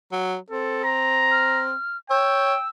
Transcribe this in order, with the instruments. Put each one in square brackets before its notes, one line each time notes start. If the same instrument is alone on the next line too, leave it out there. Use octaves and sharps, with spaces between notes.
[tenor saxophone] F#3
[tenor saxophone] C4 [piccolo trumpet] A4
[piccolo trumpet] A#5
[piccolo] F6
[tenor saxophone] C#5 [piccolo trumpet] G5 [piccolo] E6